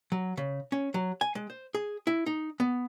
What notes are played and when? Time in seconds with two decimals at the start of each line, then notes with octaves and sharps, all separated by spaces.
0.12 F#3
0.37 C#3
0.72 C#4
0.94 F#3
1.21 G#5
1.35 G#3
1.50 C5
1.75 G#4
2.07 E4
2.26 D#4
2.60 B3